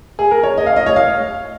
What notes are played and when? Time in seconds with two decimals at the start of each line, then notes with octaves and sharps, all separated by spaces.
0.19 G#4
0.31 A#4
0.43 C#5
0.58 D#5
0.66 F5
0.76 D#5
0.86 C#5
0.96 F5